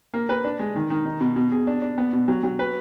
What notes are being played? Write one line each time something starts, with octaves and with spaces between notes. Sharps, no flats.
A#3
B4
D4
G#3
D#3
D#3
D#4
B2
B2
G#4
D4
D4
B3
B2
F#3
F#3
B4